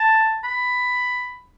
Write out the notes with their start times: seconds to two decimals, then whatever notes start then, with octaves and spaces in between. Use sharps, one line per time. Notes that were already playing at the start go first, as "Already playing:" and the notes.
Already playing: A5
0.44 B5